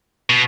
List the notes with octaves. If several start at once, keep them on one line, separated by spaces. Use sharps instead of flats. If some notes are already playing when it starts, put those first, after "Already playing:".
B2